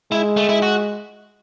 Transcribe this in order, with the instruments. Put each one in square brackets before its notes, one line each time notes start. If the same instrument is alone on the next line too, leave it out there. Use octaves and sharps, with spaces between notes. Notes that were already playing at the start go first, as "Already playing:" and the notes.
[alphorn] G#3 [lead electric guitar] E4
[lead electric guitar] A3
E4
F#4